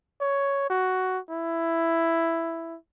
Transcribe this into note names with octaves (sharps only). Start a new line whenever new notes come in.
C#5
F#4
E4